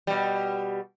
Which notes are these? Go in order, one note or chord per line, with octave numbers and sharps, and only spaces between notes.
B2 G3